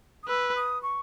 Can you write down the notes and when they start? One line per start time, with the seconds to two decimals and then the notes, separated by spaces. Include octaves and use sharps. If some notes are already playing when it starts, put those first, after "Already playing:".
0.23 D#6
0.28 B4 E6
0.56 D#6
0.83 C#6